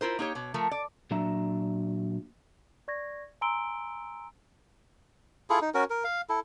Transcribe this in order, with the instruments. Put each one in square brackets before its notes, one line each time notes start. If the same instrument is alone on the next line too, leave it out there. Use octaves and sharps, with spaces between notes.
[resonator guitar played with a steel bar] E4 F4 A#4 C5
A#3 D#4 G4 C#5
B2 C#5
F3 A3 A#4
D5
[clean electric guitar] A#2 F#3 D4 E5 A#5
[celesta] D5 C#6 G#6 A#6
G#5 A#5 C6 E6 D7 G7
[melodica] E4 F4 G#4 A4
D#4
C#4 F#4 A#4
A#4
F5
E4 A4